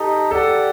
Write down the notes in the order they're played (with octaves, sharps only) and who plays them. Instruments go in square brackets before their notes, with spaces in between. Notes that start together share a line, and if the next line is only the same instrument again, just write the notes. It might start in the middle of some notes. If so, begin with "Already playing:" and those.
Already playing: [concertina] D#4 A4 D#5 [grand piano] G4
[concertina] G4 D5 F#5 [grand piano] A4